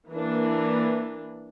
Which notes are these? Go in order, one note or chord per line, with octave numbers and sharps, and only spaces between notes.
E3 A#3 D4